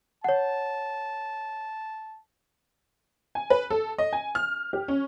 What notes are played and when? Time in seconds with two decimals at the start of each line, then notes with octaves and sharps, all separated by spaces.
0.24 C#5 F#5 A5
3.35 G#5
3.50 B4
3.70 A4
3.98 D#5
4.13 G#5
4.35 F6
4.73 G4
4.88 C#4